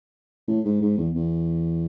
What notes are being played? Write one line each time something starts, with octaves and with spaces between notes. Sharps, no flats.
A2
G#2
G#2
E2
E2